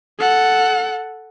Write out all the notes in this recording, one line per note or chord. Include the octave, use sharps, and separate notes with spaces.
A4 F#5